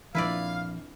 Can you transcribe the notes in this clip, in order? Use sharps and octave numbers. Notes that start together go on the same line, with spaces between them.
A#1 F2 E4 B4 D5 F5